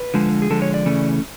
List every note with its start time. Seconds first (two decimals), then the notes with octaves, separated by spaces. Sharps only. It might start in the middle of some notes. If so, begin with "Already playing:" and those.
Already playing: B4
0.14 D3 F3 G#3
0.42 G#4
0.50 D3 F3 G#3 A4
0.62 C#5
0.74 D5
0.86 C#3 E3 A3 C#4